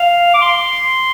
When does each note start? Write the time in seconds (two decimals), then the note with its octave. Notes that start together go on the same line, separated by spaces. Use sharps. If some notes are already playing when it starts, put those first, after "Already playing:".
Already playing: F5
0.34 D6
0.42 C6